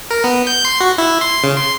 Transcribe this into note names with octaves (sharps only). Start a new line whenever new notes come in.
A#4
B3
G6
C6
F#4
E4
C6
C#3
C6